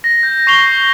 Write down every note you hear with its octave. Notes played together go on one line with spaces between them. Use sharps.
A#6
G6
C#6 C7 F7 G7